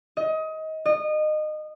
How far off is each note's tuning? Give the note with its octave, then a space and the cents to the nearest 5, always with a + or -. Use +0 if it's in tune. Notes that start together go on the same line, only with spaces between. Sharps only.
D#5 +25
D#5 -25